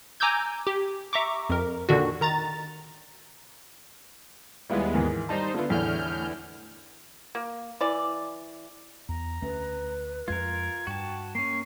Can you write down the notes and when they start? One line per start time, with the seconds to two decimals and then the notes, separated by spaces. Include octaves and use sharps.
0.20 G#5 A#5 D6 E6 G6 G#6
0.67 G4
1.13 E5 A#5 C#6 D6
1.49 F2 A#4
1.89 A#2 D3 D#3 D4 F#4
2.21 D#3 A#5 A6
4.70 D#2 G3 G#3 B3 E4 F4
4.94 G#2 D#3 E3
5.29 G3 D#4 C5 A5
5.54 D3 A3 B3 F4
5.70 E2 A2 D3 E3 F6 G6
7.35 A#3
7.81 E3 D5
9.09 E2 A#5
9.42 D2 A3 C#4 B4
10.28 F2 G#3 F4 A#4 G#6
10.87 G2 F#4 G5 A5
11.35 A#3 C#4 C#6 C7